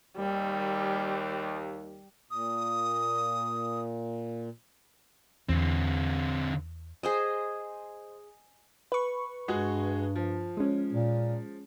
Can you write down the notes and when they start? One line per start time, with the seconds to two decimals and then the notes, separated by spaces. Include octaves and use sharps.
0.17 D#2 G3
2.31 A#2 D#6
5.49 E2 D3 C4
7.03 G#4 C5 D#5
8.92 B4 C#6
9.48 G2 G#3 F#4 G#4
10.16 F3
10.57 G#3 C#4
10.92 A#2